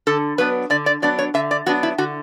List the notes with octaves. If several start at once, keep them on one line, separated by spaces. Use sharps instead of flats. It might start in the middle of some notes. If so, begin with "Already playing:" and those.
D3 A4
F#3 B3 D4 B4
D3 D5
D5
F#3 B3 D4 D5
C#5
D3 E5
D5
F#3 B3 D4 F#4
E4
D3 F#4